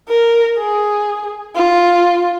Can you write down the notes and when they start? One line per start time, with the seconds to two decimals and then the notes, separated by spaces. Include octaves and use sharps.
0.09 A#4
0.58 G#4
1.55 F4